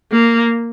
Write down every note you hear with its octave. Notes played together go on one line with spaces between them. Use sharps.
A#3